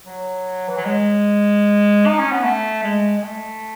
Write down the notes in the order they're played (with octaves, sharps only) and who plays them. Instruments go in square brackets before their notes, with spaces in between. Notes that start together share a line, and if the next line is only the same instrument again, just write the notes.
[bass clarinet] F#3
E3
F#3
G#3
D#4
C#4
B3
A3
G#3
G#3
A3